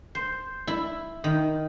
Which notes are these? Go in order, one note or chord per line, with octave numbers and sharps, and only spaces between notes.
C5
E4
D#3